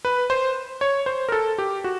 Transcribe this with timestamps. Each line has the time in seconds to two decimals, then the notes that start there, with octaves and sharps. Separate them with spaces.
0.05 B4
0.30 C5
0.81 C#5
1.06 C5
1.29 A#4
1.32 A4
1.58 G4
1.84 F#4